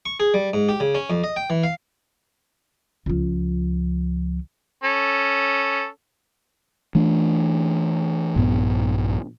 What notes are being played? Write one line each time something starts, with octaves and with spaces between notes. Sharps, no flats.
C#6
G#4
G3
G#2
G4
C#3
C#4
F2
D#5
G5
E3
F5
C#2 F3
C#4 A4
E3 A3 D4
A#1 G2 B3